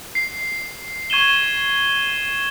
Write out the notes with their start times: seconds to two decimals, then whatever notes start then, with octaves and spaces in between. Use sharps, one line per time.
0.15 C7
1.10 C#6 G#6 D#7 E7 G7